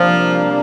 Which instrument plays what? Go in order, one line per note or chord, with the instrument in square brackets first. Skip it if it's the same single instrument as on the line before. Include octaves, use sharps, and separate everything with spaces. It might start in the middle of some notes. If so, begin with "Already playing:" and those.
Already playing: [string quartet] C3 G3 A#3 D4 [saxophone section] F3